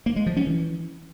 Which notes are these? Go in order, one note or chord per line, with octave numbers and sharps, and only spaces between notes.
A#3
G#3
F3
C#4
E3